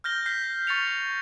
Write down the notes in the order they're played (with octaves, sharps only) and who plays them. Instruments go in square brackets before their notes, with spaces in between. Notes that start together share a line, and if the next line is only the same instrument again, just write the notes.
[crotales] F6 G6 A#6 G7
G6 B6 C7
C#6 A6 C#7 F7